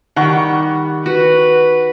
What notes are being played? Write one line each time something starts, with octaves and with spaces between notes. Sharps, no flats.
D#3 G3 F#5 C#6
F#4 B4